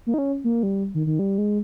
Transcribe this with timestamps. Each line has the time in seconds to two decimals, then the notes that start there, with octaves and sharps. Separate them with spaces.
0.07 A#3
0.14 D#4
0.18 C#4
0.44 A#3
0.63 G3
0.95 D#3
1.07 D#3
1.19 G3
1.38 G#3